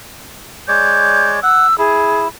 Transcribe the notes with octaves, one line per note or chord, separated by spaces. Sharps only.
G#3 C#5 D5 G6
F#5 E6
E4 G#4